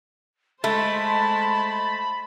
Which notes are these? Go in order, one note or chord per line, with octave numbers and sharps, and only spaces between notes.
G#3 A3 C5 A5 B5